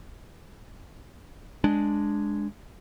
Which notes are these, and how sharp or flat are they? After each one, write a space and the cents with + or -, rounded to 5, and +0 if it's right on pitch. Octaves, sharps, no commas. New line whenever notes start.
G#3 +0 D4 +0